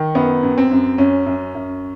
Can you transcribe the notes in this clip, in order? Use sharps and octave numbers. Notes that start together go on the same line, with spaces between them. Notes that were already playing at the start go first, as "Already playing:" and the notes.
Already playing: D#3
F#2 B3
F#2
C4
F#2
F#2 C#4
F#2
F#2